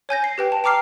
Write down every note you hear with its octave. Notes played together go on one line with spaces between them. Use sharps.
C#5 G#5 G6 A#6
C7
G4 B4 G5
A5
G5 A#5 D6 F6 C7